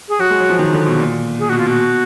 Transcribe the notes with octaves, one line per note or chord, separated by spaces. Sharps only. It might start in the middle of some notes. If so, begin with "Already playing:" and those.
G#4
F#3 F#4
G#3
F#3
F3
D#3
D3
B2
A#2
G#4
B2 F#4
F4
B2 F#4